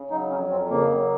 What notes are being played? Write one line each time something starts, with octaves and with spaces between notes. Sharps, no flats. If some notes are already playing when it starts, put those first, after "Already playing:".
Already playing: C#3
F#3 D#4
F2 C#4
F2 C4
C#3 A#3
F#3